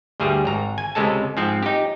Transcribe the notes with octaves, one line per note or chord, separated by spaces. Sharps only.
D2 G2 G3 G#4
G#1 A#5
G#5
C#2 C3 G#3 A4 A5
G#2 F3 C4
D#4 G4